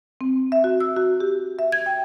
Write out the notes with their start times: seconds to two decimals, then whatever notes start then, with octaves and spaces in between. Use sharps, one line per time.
0.21 C4
0.52 E5
0.64 F#4
0.80 E6
0.97 F#4
1.20 G4
1.59 E5
1.72 G#6
1.86 G5